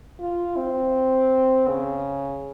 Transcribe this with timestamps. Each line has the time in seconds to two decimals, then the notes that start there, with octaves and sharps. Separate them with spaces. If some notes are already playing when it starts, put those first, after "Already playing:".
0.20 F4
0.57 C4
1.68 C#3